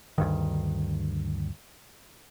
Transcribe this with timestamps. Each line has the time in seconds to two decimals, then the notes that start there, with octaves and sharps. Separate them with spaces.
0.18 D2 G2 D#3